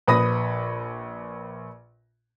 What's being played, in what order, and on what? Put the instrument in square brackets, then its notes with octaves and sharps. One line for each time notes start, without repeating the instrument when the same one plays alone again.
[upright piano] A#1 B4 B5 D#6 A#6